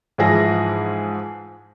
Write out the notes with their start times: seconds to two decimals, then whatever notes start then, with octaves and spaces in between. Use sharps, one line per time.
0.18 G#2 E3 F3 E4 G#4 A#6